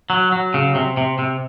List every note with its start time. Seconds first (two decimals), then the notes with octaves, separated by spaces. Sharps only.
0.10 F#3
0.32 F#3
0.54 C#3
0.75 C3
0.97 C3
1.19 C3